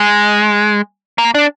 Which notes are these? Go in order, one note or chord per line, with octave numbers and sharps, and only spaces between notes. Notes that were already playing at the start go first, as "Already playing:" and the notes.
Already playing: G#3
A#3
D4